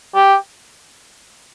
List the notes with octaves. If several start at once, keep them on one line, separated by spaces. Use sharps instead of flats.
G4